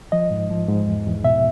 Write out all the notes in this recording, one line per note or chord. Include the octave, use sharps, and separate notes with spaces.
F3 D#5
G#2
F3
G#2
E2
E2
B2 E5